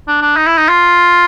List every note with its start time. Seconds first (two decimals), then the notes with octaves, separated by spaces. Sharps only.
0.08 D4
0.21 D4
0.36 D#4
0.46 E4
0.57 D#4
0.68 F4